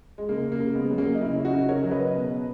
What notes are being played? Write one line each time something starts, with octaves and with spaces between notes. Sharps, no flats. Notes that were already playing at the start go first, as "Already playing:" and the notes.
G#3
C#3 A#3
A#3
C#3
G#3 B3
F#3
A#3 C#4
D#4
C#3 C#4 E4
D#4 F#4
C#3
A#4 C#5
F#3
B4 D#5
B2